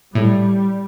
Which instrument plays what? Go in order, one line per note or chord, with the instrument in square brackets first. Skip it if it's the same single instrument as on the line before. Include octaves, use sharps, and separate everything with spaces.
[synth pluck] A2 [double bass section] G3